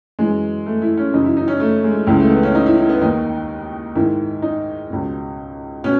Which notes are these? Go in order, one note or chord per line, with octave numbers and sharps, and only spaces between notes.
F#2 E3 G#3
A3
E4
C#4
F#2 C#3 E3 D#4
E4
D#4
C#4
A3
G#3
C#2 C#3 E3 G#3
A3
B3
C#4
D#4
E4
E4
B3
D#2 D#3 D#4
G#2 D#3 E4
D#4
C#2 B2
B2 C#4